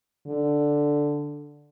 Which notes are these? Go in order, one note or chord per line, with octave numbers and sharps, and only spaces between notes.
D3